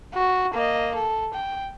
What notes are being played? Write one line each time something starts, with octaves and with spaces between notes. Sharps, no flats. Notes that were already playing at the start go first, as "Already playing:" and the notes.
F#4
A#3 D#5
A4
G5